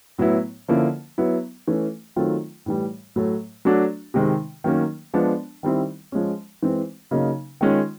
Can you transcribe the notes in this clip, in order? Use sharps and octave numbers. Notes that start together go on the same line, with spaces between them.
A2 F#3 B3 E4
D3 F3 A#3 C#4 E4
F#3 B3 E4
E3 A3 C#4
D#3 F#3 A3 C4 F4
A2 E3 G3
A2 F#3 A3
F#3 A3 D4 F#4
C3 D#3 G#3 C4
D#3 F#3 A#3 C#4
F3 G#3 B3 D4
D#3 G3 C4 E4
F3 G#3 C#4
E3 G#3 C4
C#3 F#3 A#3 D#4
D#3 G#3 C#4 F4